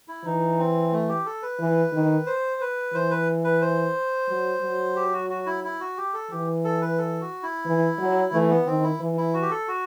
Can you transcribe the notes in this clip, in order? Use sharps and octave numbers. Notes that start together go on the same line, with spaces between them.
E4
E3 D#4
C4
A3
G4
A4
B4
E3
D#3
C5
B4
E3 C5
B4
B4
C5
F#3
F#3
G4
F#4
F#4
E4
E4
F#4
G4
A4
E3 G4
A4
B4
A4
F#4
E4
E3
F#3
E3 A3
B3
D#3 C4
E4
E3
E4
F#4
G4
A4
F#4